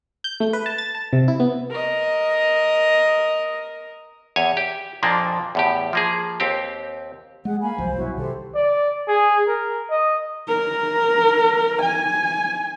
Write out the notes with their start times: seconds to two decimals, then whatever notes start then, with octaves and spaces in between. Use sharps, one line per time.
0.24 G6
0.40 A3
0.53 B4
0.66 A5
0.78 A6
0.95 A5
1.13 C3
1.28 E4
1.40 B3
1.70 A#4 D#5
4.36 E2 C#5 G#5
4.57 G4
5.03 F2 A#2 F3 A#3 D4
5.55 E2 A2 G4
5.93 F3 A#3 G#4
6.40 D#2 C4 G4
7.45 G#3 G#4 F#5
7.61 A#3 F5 G#5 B5
7.78 C2 F3 F#3 C5
7.95 B1 B2 F#3 E4 F#4 C#5
8.17 C3 D#3 F#3 G4 A4 C5
8.55 D5
9.08 G#4
9.48 A#4
9.90 D#5
10.48 A#4
11.82 G#5